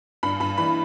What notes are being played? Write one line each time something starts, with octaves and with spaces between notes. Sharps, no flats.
G2 B5
G2 B5
E3 B5